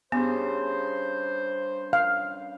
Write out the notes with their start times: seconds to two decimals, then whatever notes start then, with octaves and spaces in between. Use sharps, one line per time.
0.12 G2 C#3 B3 C5
1.93 F5